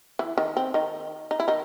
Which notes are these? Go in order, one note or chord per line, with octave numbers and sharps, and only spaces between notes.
E3 E4
D#3 D#4
C4
D#3 D#4
D#4
E4
D#3 D#4